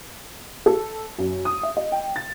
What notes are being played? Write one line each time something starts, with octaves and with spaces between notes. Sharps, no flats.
A4
F#2
D#6
E5
D#5
G5
A6